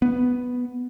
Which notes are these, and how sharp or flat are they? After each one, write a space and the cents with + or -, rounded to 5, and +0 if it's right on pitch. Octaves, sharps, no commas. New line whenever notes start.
B3 +0